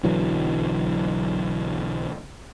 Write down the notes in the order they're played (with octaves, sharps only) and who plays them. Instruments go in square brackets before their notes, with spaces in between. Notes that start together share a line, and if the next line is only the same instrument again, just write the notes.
[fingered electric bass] B1 D3 E3 F#3